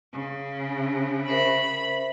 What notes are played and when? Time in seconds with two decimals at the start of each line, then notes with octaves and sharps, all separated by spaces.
0.13 C#3
1.28 A#4 C5 E5 B5